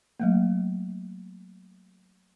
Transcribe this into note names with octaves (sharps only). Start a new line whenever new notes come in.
F#3 A3 A#3